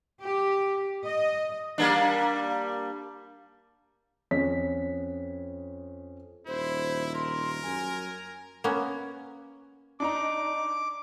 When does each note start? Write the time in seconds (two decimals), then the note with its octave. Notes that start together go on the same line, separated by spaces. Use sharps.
0.21 G4
1.05 D#5
1.78 G3 A#3 D4
4.31 F2 C#4 C#5 B6
6.47 D#1 E4 C5
7.15 A#4 C6
7.63 F#2 G#5
8.64 A#3 B3 C#4
10.00 D4 D#4 A#5 D6